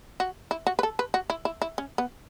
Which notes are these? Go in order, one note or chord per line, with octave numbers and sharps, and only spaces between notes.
F#4
E4
F#4
B4
A4
B4
F#4
E4
E4
E4
C#4
B3